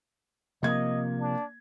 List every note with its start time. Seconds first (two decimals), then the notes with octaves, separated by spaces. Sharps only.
0.63 C3 F3 A#3 D#5 G#6
1.20 D4